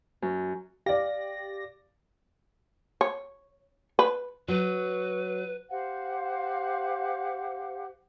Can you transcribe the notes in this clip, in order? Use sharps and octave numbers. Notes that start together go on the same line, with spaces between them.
F#2
G4 D5 F5 A#6
C#5
B4
F#3 B4
G4 C5 F5 F#5